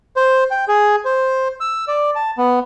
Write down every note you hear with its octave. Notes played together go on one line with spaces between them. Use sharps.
C5
G5
G#4
C5
E6
D5
A5
B3